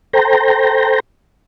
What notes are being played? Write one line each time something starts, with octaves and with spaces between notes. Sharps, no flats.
A4 C5 G5 A#5